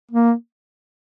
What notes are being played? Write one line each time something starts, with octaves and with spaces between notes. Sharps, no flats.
A#3